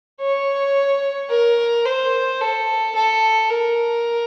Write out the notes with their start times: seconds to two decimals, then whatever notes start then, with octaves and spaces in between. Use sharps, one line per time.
0.21 C#5
1.30 A#4
1.85 C5
2.40 A4
2.95 A4
3.49 A#4